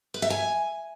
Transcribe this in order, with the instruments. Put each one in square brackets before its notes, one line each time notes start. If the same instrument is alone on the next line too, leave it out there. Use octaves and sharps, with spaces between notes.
[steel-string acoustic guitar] B4
E5
G#5